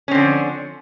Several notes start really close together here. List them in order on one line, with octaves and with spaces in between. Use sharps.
C#4 C4 D3 F3